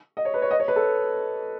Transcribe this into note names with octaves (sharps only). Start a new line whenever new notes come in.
D#5
C#5
B4
C#5
D#5
C#5
B4
A4